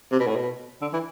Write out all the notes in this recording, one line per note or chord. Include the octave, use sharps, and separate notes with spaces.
C3
B2
A2
B2
D3
E3